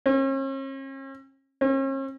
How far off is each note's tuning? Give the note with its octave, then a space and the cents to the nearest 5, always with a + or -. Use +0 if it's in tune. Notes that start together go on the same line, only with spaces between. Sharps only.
C#4 -45
C#4 -45